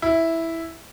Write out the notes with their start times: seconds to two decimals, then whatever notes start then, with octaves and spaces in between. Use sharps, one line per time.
0.02 E4